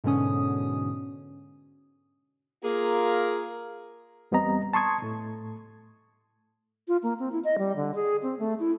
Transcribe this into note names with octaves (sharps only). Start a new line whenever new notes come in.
G#2 B2 D3 C#4 D#6
A#3 F4 G#4 A#4
E2 G3 B3 C4 D#5 A#5
A5 C6 C#6 D#6 G#6
A2 A3
F4
A#3
C4
E4
D#5
G3
D3
G#4
C4
A3
E4